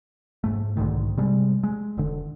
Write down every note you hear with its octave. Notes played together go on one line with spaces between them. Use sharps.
G#2 A3
B1 G#2 D3 D#3
C3 G3 G#3
G#3
E1 D3